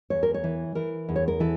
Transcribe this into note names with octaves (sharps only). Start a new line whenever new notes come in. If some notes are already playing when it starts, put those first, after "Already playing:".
E2 C#5
A#4
C#5
E3
E3 A#4
E2
C#5
A#4
E3 A4